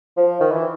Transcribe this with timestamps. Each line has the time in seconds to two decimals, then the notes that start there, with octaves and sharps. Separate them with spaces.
0.17 F3
0.41 D#3
0.52 E3